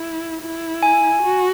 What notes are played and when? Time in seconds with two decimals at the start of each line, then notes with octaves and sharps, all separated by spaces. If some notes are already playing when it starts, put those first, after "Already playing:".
Already playing: E4
0.42 E4
0.83 G#5
1.22 F#4